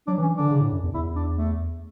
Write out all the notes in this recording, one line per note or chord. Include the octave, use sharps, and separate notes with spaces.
F#3 D4
E3
C#4
D3 D4
C#3
A2
F#2
E2
E2 E4
D4
A3